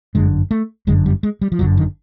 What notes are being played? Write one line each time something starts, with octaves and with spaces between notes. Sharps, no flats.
G1 F#2 D3 G#3
A3
G1 F#2 D3 G#3
G3
G#3
G3
F3
G1 F#2 D3 F#3
D#3